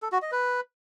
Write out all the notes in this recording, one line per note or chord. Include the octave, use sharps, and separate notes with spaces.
A4
F#4
D#5
B4